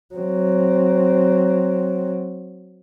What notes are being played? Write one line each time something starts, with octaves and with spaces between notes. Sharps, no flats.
F#3 C4